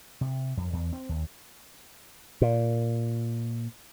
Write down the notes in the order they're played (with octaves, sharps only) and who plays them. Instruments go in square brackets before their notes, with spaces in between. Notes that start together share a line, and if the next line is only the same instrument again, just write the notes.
[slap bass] C3
F2
E2
C4
D#2
A#2